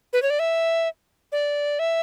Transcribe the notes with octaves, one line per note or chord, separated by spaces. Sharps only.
B4
C#5
D5
E5
D5
E5